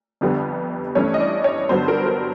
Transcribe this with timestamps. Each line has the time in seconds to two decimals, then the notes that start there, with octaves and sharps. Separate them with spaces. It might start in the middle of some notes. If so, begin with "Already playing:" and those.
0.21 G1 F2 D3 G3 B3
0.95 G2 E3 A3 C#4 E4 C#5
1.14 D#5
1.20 D5
1.44 C#5
1.69 G2 D3 F#3 B3 C5
1.88 A#4
2.06 A#4